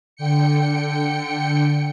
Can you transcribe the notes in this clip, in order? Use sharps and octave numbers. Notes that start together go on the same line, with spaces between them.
D3 G5 C#7